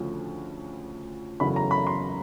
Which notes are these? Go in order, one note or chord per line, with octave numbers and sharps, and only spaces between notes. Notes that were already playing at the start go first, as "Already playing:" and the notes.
Already playing: D2 C#3 F3
F#1 E2 C#3 F#3 A3 B5
A#5
B5
C6